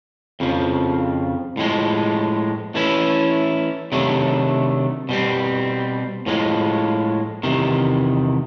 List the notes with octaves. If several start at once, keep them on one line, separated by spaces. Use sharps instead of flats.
F2 C#3 F3
A2 F3 G#3
E3 A3 C#4 E4
C3 D#3 F#3 A3 D4
B2 G3 C4
A2 F3 G#3
E2 C3 D#3